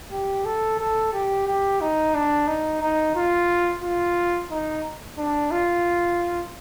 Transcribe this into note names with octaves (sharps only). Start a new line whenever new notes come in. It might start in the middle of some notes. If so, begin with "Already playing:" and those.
G4
A4
A4
G4
G4
D#4
D4
D#4
D#4
F4
F4
D#4
D4
F4